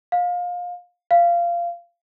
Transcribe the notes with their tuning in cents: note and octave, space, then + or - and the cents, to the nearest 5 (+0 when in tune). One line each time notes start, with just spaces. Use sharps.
F5 +25
F5 -20